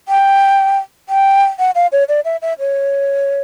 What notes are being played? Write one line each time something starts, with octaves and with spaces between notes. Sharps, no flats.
G5
G5
F#5
F5
C#5
D5
E5
E5
C#5